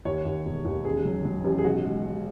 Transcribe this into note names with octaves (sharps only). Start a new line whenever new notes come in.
D#2 C#5
D#2
E1
D#2
A1 G#4
F#3
F#3
A1
G#4
B1 F#4
G#3
G#3